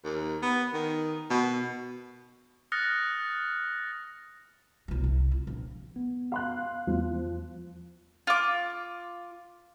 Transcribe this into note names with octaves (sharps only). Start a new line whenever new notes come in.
D#2
B3
D#3
B2
D#6 F6 F#6 A6 A#6 C#7
B1 E3
C2
F4
A#1
B3
F5 C6 F#6
E2 F3
F4 D6